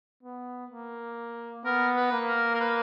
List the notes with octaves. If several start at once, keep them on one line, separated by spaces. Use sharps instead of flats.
B3
A#3
B3 A#4
B4
A#3
A#4
A#4
B4